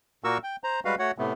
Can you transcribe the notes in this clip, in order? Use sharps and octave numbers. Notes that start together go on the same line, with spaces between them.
A#2 A#3 F#4 A#4 C#6 E6
G5
C5 A#5
G3 G#3 F#4 B4 F5
A3 F#4 C#5 F#5
A2 C3 A3 B3